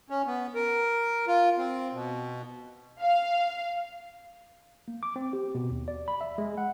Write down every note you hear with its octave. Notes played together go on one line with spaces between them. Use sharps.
C#4
B3
A#4
F4
C4
B2
F5
A#3
D6
C4
G4
B2
D#2
D5
B5
E5
G#3
F#5